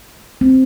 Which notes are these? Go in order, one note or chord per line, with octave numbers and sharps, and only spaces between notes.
C4